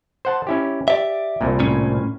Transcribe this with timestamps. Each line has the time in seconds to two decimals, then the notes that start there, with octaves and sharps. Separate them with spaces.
0.25 C5 F#5 A5
0.47 C#4 E4 G4
0.88 G4 D5 E5
1.41 C2 A#2
1.60 A2 C#4